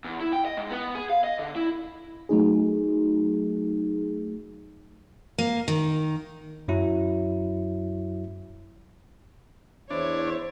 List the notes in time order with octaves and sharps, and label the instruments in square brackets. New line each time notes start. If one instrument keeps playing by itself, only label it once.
[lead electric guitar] E2
E4
G5
D#5
G#2
B3
G#4
F5
D#5
D3
E4
[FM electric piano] F#3 A3 D#4 G#4
[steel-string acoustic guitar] A#3
D#3
[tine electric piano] F#2 F#3 E4
[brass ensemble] E2 E4 [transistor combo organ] D4 [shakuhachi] C5 [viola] C#5